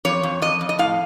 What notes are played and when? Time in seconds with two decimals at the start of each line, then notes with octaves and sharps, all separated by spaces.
0.05 F2 C#5
0.23 F2
0.42 F2 D#5
0.61 F2
0.69 D#5
0.79 A2 F5